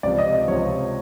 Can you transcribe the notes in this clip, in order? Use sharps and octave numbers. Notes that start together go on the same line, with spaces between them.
C#2 C3 F3 D5
D#5
D#5
C#2 C3 F3 C#5